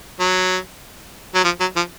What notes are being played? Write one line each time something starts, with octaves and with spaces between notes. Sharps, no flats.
F#3
F#3
F3
F#3
F3